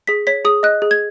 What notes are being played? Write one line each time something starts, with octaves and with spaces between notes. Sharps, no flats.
G#4 B6
C#5 B6
G#4 D#6
D#5 F#6
G#4
G#6